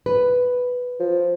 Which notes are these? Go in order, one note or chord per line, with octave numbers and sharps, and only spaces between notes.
B4
F3